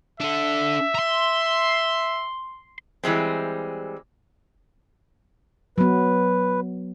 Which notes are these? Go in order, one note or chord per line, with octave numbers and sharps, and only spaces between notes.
D4 A4 E5
A#5 C6
E3 G3 G#3 C4
F#3 B3 B4